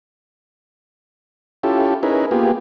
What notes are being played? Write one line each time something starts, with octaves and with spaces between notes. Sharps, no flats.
C#4 E4 F4 G4 A4
C#4 D#4 E4 G#4 A#4 B4
A#3 B3 F4 G4 G#4